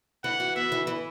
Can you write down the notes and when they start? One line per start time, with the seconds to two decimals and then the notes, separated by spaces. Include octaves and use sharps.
0.24 E3 F#5
0.40 F#4
0.56 B3 E5
0.72 E3
0.87 E3